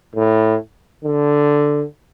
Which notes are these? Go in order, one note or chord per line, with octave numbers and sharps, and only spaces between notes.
A2
D3